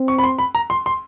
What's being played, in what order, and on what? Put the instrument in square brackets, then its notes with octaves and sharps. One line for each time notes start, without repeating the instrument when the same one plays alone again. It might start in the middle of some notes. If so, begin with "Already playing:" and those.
Already playing: [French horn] C4
[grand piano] C#6
B5
C6
B5
A#5
C6
C6